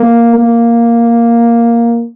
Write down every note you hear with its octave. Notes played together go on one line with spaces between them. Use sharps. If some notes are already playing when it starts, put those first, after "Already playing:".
Already playing: A#3
A#3